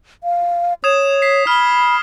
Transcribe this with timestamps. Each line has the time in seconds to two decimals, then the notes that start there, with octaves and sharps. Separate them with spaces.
0.24 F5
0.84 C#5 D#6 G#6 E7
1.22 B6 C7
1.47 B5 F6 B6 G7